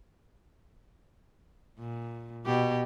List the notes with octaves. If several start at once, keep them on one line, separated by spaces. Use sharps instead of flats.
A#2
B2 G4